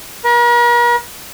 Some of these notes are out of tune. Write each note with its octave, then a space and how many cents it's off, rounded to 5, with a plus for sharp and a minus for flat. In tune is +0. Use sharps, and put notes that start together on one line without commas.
A#4 +45